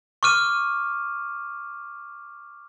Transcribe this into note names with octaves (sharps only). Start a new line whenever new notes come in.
C#6 D6 F6 D#7